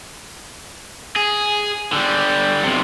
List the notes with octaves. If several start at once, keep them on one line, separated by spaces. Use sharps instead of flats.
G#4
D3 G3
B1 C3